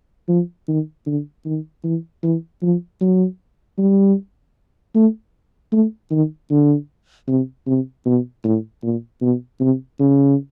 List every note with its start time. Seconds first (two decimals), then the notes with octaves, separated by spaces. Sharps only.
0.29 F3
0.68 D#3
1.06 D3
1.46 D#3
1.84 E3
2.23 E3
2.62 F3
3.01 F#3
3.78 G3
4.95 A3
5.72 A3
6.11 D#3
6.51 D3
7.28 C3
7.67 C3
8.06 B2
8.44 A2
8.83 A#2
9.22 B2
9.61 C3
10.00 C#3